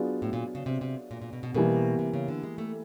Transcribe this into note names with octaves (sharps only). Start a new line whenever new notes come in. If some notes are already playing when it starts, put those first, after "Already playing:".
Already playing: F#3 B3 D4 F4 G#4
A2
A#2
C#3
C3
C3
A#2
A#2
B2
B2
B2 E3 G3 A#3
C3
C#3
D3
G#3
A3